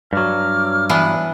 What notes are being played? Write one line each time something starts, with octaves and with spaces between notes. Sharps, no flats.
G2 F#3 D6 F6
E3 B3 D4